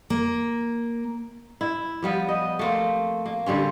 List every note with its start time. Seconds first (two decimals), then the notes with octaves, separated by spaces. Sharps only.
0.10 A#3
1.61 E4
2.02 F3 G3 B3
2.29 D#5
2.59 A3 A#3 C4
3.26 A#3
3.46 D3 G3 C4 C#4